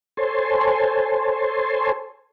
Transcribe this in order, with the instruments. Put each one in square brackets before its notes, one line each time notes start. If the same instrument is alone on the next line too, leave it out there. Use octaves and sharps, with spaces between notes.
[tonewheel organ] A4 C5 C#5 G#5 A5 C6